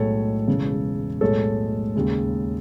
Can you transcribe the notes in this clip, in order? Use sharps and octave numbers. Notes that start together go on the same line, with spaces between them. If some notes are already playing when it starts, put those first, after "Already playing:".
Already playing: B1 A2 G#3 A4 C#5
E1 E2 C#3
B1 A2 G#3 A4 C#5
D#2 C#3 G#3